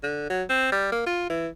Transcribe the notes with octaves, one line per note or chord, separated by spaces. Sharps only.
D3
F#3
C4
G3
A#3
F4
E3